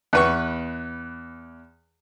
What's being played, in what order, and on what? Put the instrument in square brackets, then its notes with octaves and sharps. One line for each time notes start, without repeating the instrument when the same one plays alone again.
[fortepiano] E2 B4 C#6